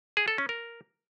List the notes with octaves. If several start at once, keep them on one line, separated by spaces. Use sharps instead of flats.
G#4
A4
C#4
A#4